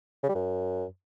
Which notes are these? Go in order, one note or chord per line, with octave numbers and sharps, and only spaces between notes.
C#3
G3
F#2